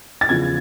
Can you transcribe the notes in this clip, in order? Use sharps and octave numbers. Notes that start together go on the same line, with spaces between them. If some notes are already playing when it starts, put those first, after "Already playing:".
A6
E2 C#3 F3 G#6